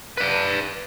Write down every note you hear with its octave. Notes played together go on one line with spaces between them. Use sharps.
B4 D5